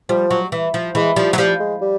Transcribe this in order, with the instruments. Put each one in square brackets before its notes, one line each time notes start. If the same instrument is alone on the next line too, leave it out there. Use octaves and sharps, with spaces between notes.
[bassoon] F3 [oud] G3
[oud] F#3
E3
F3
[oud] E3 [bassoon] G#3
[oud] F3 [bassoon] G3
[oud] F#3
[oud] F3 [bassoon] G3
[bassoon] G#3
G3